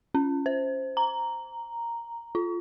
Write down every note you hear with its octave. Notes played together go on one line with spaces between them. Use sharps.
C#4
C5
A#5
F4